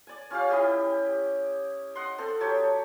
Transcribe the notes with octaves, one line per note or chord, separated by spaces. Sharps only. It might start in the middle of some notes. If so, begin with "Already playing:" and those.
D5 G#5
C#4 F4 G4 F5
E4 G4 D#5
D#5 F#5 C6
C4 A4 C5
F#3 G4 C#5 A5